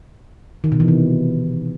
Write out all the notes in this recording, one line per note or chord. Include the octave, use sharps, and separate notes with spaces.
D#3
B2
E3
C3